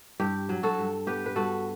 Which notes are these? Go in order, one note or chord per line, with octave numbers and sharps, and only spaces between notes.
G2 G4
F#3
F#4 A4
G2
B3 G4 B4
B4
G2 F#4 A4